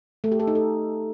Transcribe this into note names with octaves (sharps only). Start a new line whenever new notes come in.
A3
G4
A4
D#4
A4